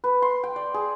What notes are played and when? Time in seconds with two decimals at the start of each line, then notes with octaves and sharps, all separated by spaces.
0.04 B4
0.22 C6
0.44 G5
0.56 D5
0.74 G#4